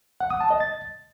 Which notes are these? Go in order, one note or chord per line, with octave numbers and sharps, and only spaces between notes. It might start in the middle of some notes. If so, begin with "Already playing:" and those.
F#5
D#6
A5
D#5
A6